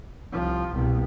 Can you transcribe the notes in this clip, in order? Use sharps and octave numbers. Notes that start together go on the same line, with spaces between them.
C2 F3
C2 B2